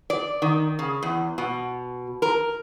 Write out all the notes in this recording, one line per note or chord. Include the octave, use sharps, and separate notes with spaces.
D5
D#3
C#3
E2
B2
A#4